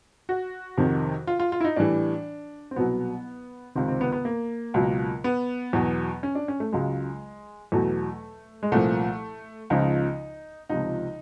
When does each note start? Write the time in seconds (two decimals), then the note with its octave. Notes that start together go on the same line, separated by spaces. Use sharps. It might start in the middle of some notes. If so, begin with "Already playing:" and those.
0.29 F#4
0.77 F2 C3 D#3
1.27 F4
1.39 F4
1.52 F4
1.61 E4
1.64 D#4
1.76 A2 E3 G3 D4
2.71 C4
2.76 C2 B2 F#3 B3
3.75 C#2 C3 D#3 C4
3.88 C4
4.01 B3
4.12 B3
4.25 A#3
4.74 C#2 B2 F#3
5.24 B3
5.73 E2 B2 F#3
6.23 C#4
6.35 D4
6.48 C#4
6.60 A3
6.72 C#2 C#3 F#3 G#3
7.72 E2 B2 F#3 A3
8.63 G#3
8.72 C2 A#2 F3 A3
9.70 C#2 C#3 F3 D#4
10.69 C#2 C3 F3 D#4